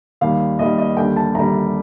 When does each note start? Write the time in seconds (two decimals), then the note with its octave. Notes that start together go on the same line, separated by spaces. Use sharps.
0.21 D#2 D#3 G3 F5
0.59 D#2 D#3 G3 D#5
0.78 D#5
0.97 D#2 D3 G3 G5
1.17 A5
1.35 D#2 D3 G3 A#5